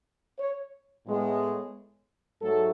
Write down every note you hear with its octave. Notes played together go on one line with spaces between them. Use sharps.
C#5
A2 G#3 B3
G#2 F#3 A3 A4